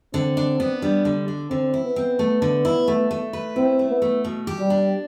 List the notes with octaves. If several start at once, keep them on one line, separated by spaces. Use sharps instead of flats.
D3 C4
D4
B3
G3 D4
D3
D4
D3 C4
E4
B3
C4
A3
D3
E4
A3
A3
B4
C4 E4
A3
B3
A3
B2
G4
G3
D4